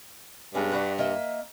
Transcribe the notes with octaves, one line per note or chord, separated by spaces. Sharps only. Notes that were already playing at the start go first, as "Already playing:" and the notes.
G2 G#3 B3 C#4
D4 F#4 B4
A#3 D#5 E5